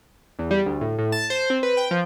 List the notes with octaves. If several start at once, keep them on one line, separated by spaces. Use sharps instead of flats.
E2
G3
D2
A2
A2
A5
C5
C4
B4
G5
F3